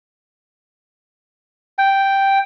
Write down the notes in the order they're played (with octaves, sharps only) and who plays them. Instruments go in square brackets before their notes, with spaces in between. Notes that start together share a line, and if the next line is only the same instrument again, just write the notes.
[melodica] G5